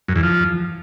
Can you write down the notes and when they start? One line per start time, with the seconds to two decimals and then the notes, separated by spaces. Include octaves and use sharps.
0.08 F#2
0.16 E2
0.23 F3